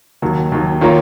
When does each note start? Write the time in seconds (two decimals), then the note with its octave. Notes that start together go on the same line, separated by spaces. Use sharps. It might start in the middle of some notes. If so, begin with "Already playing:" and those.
0.22 D#2 D#3 F#3
0.52 D#2 D#3 F#3
0.81 D#3 A#3 F4 A#4 C#5